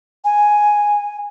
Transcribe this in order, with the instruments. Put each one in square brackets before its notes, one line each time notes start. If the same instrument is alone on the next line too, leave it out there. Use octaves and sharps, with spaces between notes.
[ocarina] G#5